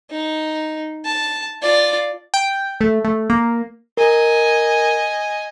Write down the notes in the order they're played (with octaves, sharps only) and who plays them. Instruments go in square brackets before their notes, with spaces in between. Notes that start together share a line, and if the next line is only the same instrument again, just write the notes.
[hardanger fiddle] D#4
A5
F4 D5
[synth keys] G5
A3
A3
A#3
[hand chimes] A#4 [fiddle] D#5 G#5